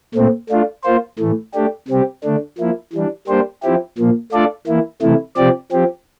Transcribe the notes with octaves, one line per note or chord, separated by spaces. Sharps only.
A#2 A3 C4
A3 D4 F4
A#3 F4 C5
A2 E3 A3
A3 D4 G4
C3 G3 C4 G4
D3 A3 D4
F3 A#3 E4
E3 G3 D4
G3 A#3 D4 G4 C5
F3 C4 E4 G4
A#2 F3 A#3
A3 D4 F4 A4 D5
E3 A#3 E4
C3 E3 A3 E4
C3 F3 C4 G4 D5
F3 C4 G4